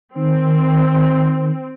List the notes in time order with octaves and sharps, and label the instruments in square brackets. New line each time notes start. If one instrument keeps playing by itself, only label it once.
[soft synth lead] D#3 [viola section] C4